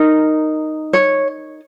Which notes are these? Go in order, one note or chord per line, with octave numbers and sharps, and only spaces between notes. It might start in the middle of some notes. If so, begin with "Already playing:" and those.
Already playing: D#4 A#4
C#5